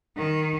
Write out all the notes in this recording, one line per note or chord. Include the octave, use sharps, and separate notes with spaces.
D#3